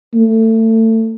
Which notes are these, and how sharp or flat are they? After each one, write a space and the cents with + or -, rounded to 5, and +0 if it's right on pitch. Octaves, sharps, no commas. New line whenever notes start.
A3 +25